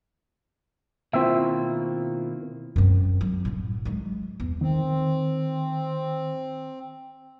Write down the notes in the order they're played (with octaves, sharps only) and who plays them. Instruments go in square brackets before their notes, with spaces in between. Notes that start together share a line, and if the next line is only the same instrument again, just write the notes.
[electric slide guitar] B2 D#3 A#3 [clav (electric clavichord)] C4 E5 [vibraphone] E4 F4
[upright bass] F#2 C4
F#3
A2 D3
F#3 G#3
E2
[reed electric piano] D#3 [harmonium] C4